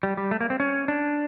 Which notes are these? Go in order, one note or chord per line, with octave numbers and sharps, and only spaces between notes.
G3
G3
A3
A#3
C4
C#4
D4